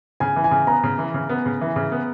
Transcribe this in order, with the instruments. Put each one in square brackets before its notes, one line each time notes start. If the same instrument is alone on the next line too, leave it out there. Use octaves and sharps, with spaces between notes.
[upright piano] C#3 [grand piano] G#5
[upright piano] E3
[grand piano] G#5
[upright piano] C#3
[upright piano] B3 [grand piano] A#5
[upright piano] C#3
E3
C#3
B3
C#3
E3
C#3
B3